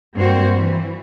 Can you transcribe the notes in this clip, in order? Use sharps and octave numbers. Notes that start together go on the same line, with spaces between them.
G2 A#3 C4 F#4 C5
E3